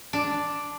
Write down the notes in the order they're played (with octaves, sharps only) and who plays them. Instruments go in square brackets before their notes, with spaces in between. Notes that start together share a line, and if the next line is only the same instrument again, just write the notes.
[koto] D4